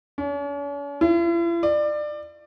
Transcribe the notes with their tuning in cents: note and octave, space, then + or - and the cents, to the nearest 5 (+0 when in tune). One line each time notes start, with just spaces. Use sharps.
C#4 +45
E4 +45
D5 +25